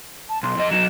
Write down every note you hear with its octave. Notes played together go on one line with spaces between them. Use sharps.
A5
B1 C6
F2 D#5
F#3 D#4 E7